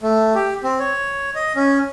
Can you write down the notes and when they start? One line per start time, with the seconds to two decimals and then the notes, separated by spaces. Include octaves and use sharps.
0.03 A3
0.35 G4
0.63 C4
0.79 C#5
1.35 D#5
1.56 C#4